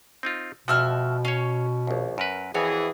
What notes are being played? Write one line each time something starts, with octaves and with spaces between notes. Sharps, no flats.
C4 D#4 F4
F2 B2 F3 F#4 E5 F6
C#4 C#5 F5
A#1 D#2
F#2 A#4 B4
F2 E3 F#4 G#4 C#5